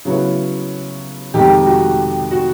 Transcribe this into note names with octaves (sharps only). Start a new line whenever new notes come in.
C#3 F#3 B3 E4
F2 C3 D#3 G#3 G4
F#4
F#4